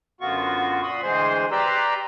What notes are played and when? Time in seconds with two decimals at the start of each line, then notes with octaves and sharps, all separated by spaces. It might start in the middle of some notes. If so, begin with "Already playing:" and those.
0.21 F#2 D3 B3 F4 F#4 C#6
0.83 A#2 F#4 B5 C6 D#6
1.03 D2 E3 G#3 G#4 C5 C6
1.52 G4 B4 D5 A#5 C6 E6